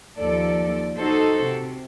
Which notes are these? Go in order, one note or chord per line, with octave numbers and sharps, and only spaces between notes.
D#2 F3 A4 D5
D#4 F#4 A4 C5
C3